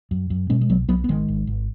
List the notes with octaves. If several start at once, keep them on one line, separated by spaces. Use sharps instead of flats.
F#2
F#2
B2 G#3 C#4
G#3
B1 F#3 B3
B1 F#3 B3
B3
G#1 D#3 G#3
G#1
G#1